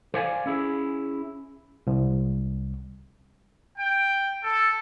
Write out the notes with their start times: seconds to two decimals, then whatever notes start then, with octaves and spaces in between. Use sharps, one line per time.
0.14 A4 C5 D5 F5 G5 G#5
0.46 C#4 E4 G#4
1.87 C2
3.77 G5
4.43 A4